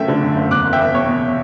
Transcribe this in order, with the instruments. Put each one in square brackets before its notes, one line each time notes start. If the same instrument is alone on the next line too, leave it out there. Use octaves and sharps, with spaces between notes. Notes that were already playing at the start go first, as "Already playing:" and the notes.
Already playing: [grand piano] F#1 F#2 A3 E5 G5
D3
F#2
F#1
E2 D6 F#6
F#1
E5 G5
F#1
B2 C#5
E2